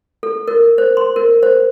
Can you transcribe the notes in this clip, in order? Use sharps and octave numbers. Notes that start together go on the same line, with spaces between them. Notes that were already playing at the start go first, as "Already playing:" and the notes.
A4
A#4
C5
C6
A#4
C5